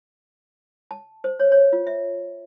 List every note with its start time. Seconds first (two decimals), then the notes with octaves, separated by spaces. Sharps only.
0.91 A5
1.24 C5
1.39 C#5
1.52 C#5
1.73 F4
1.87 E5